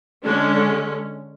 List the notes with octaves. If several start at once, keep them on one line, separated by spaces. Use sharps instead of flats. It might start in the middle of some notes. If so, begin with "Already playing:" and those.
D3 G#3 C#4 D4